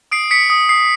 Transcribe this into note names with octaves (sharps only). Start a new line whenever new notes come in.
D#6 C7 D7
D#6 B6 C#7
D#6
D#6 C7